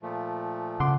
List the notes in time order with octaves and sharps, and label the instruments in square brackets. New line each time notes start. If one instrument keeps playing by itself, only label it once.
[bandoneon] A#2 F3 A3
[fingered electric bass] C#3 [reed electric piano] F#5 C6 D6